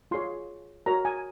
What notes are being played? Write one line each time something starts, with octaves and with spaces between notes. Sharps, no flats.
F4 G#4 C#5 C6
F#4 A#4 C#5 A#5
G#5